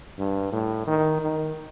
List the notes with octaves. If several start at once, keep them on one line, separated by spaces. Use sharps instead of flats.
G2
A2
D#3
D#3